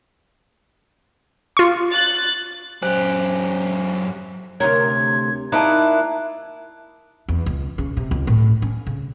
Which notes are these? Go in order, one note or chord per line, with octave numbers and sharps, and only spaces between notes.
F4 C#6
F#6 A6
F#2 G4 C5 G#5 F#6
D2 C3 A#4 C#5 G#6
A#3 D#4 E4 D5 A5 A#5 F#6
E2
C#2
C#3
C3
C#2
A2
C#4
C#3